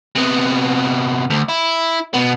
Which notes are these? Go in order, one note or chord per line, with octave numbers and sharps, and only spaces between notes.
C3 B3
D2
E4
B2 B3